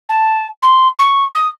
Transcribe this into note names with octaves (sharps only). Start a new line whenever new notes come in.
A5
C6
C#6
D#6